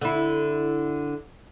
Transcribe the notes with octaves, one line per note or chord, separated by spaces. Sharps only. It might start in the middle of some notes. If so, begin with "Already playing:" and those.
D3 E4